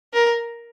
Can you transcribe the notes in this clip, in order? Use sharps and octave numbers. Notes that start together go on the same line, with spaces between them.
A#4